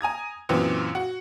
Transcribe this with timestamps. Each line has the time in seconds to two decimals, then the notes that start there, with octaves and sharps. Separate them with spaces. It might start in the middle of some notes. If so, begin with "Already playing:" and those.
0.01 G#5 A#5 D#6 G#6
0.49 F#2 A#2 E3 B3 C4
0.95 F#4